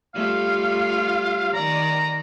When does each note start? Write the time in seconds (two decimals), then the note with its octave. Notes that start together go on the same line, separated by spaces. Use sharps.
0.15 G3 A3 F4 F5
1.54 D#3 D5 A#5